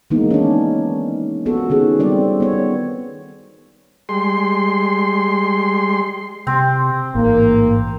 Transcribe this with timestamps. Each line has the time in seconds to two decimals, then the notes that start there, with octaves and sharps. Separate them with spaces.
0.10 D#3 E3 G#3 A#3 B3 D#4
0.30 C#4 D4
1.46 B3 F4 F#4 A4
1.70 D#3 C#4 G#4
1.99 G3 C4 D5
2.40 B3 C#5
4.09 G3 G#3 C6
6.47 C3 C4
7.15 A1 G#2 A#3